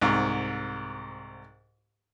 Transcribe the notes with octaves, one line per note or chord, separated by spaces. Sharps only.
C2 G#2